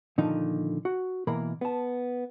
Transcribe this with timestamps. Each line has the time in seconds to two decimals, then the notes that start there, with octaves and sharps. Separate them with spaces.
0.18 A#2 D3 D#3 F3 D#4
0.85 F#4
1.27 B2 E3 A#3 A#4 B5
1.61 B3 A5